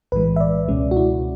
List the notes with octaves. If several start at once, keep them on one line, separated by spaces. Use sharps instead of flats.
B1 A2 E3 G#3 B4
E5
D5
C#2 B2 G#3 C#4
F#4
E4